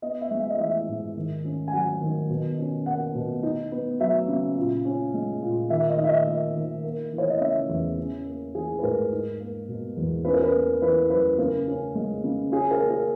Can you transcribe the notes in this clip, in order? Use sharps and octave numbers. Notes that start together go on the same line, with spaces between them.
B3 D#5
E5
G#3
E5
D#5
E3 E5
G#2
D#3
C#4
G#5
F#3 F#5
D#3
B2
C#4
A#3 F#5
B2
D#4
B3
F#3 E5
C#3
A#2
C#4
G#3
A#2
D#3 E5
D#5
D#4
E5
D#5
A#3 D#5
D#3
A#3
E3
C#5
D#5
C#3 E5
E2
C#4
A#3
E3 G#4
B4
G#2 A#4
D#4
A#3
B2
E2
C#4 B4
A#4
B4
A#3
E3 B4
F#2 B4
C#3 A#4
C#4
G#3
C#3
C#4 G#4
A#4
A#3
A#4